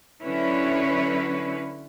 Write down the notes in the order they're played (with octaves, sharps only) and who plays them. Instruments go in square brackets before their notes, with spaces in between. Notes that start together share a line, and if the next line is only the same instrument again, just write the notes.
[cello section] D3 F#3 C#4 E4 B4 C#5